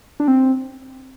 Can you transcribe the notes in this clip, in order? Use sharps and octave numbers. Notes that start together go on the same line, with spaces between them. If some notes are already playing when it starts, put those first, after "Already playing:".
D4
C4